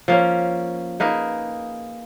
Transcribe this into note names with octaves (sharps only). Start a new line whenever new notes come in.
F3 A#3 C#4
A#3 D#4 G#4 B4